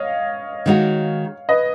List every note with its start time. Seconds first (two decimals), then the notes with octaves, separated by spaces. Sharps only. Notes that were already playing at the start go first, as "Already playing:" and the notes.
Already playing: C#5 D#5 F5
0.66 D#3 G#3 D#4 F#4
1.49 B4 D#5